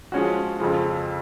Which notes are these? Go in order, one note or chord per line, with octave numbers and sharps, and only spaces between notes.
F3 G#3 C#4 F#4
F2 C#3 F3